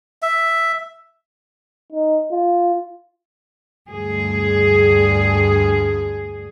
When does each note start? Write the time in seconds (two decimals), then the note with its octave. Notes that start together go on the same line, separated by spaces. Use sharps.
0.22 E5
1.92 D#4
2.32 F4
3.90 D2 G2 G#4